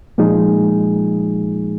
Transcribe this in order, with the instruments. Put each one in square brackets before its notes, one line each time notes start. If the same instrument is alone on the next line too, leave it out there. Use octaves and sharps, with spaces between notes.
[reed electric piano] A#2 F3 G#3 D#4 G#4